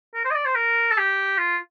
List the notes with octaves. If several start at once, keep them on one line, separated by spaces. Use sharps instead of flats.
A#4
C5
D#5
D5
C5
A#4
A4
G4
F4